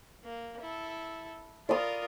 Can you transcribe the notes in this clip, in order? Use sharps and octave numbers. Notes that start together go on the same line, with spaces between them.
A#3
E4 A4
F4 A#4 D5 D6 D#6